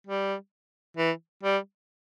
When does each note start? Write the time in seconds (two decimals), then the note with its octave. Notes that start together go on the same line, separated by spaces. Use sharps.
0.07 G3
0.97 E3
1.44 G3